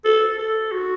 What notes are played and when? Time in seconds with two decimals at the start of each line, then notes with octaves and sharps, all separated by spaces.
0.05 A4
0.38 A4
0.72 F#4